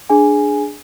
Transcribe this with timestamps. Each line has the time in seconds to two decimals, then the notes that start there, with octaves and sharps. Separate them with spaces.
0.09 D4 G#4 G#5